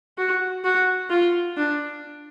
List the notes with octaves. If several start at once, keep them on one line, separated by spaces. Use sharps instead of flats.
F#4
F#4
F4
D4